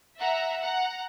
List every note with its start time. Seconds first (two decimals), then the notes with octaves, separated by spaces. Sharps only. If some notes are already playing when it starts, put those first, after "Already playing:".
0.19 E5 F#5 A#5
0.59 F#5 A#5